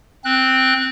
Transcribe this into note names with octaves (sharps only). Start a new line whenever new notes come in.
C4 F#6